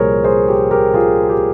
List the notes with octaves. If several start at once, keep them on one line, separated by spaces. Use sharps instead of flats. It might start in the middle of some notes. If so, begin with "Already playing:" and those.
Already playing: C2 A#2 F3 G#4 A#4 C5 C#5
G#4 C5
G4
G4 A#4
F4 G#4
G4